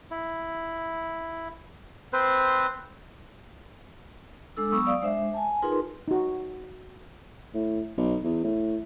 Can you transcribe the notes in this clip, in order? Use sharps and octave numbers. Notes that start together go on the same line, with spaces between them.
E4
C4 B4 C5
G#3 D4 A4 E6
F#3 B3 C#6 D#6 E6
D5 F5 D#6
G#3 D4 C5 E5
G#5 A5
D#4 F4 G#4 A#4 B4 C6
D#4 F#4
A2
B1
E2
A2